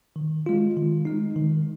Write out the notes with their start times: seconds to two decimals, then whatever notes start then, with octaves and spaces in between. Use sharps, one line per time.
0.16 D#3
0.46 G#3 F4
0.77 D#3
1.05 G#3 D#4
1.36 D#3